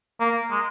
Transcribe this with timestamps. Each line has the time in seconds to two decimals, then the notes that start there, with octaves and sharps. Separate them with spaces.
0.20 A#3
0.51 G#3